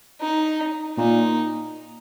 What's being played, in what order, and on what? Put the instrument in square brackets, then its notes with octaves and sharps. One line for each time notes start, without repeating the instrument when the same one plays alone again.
[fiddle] D#4
[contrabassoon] A#2 [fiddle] D#4